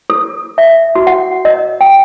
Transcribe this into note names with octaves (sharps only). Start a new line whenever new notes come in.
A4
E5
F#4
F#5
D#5
G5